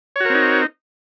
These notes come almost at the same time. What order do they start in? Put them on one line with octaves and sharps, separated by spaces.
C#5 F#4 A#4 C4 D#4